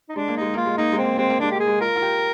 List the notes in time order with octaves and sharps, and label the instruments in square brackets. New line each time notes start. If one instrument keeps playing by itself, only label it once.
[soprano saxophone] D#4
[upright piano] G#3 [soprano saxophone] D4
[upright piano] A#3
[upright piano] G#3 [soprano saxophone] D#4
[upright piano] A#3 [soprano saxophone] F4
[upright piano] G#3
[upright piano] A#3 [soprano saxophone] D#4
[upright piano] G#3
[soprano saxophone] C4
[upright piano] A#3
[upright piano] G#3 [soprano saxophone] C4
[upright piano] A#3
[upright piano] G#3 [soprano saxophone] D4
[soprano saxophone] G4
[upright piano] A#3 [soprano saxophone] G#4
[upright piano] G#3
[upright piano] F4 [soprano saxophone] A#4
[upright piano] F4
G4